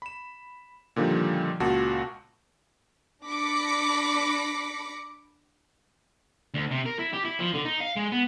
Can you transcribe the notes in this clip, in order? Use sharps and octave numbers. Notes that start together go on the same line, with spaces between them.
B5 E7
A#2 D3 D#3 F3 G3
C#2 A#2 F#4 A5
D4 B5 D6 A#6 B6 C#7
D2
C3
A#4
E4
G4
E4
F3
D3
D#4
F5
G#3
B3